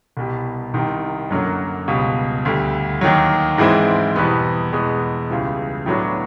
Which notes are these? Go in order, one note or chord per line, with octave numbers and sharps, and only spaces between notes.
C2 B2 G3
C2 C3 D#3
F#2 D3 F#3 A#3
C#2 B2 G3
D2 D3 G3
D#2 D#3 F#3
G#2 E3 G#3 C4 E4
E2 B2 G3 B3
E2 B2 G#3 B3
C#2 C#3 E3 G3
A2 F#3 B3 D4 F#4